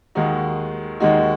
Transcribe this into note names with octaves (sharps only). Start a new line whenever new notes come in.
D#2 D#3 G#3 D#4 F#4
D#2 D#3 G#3 D#4 F#4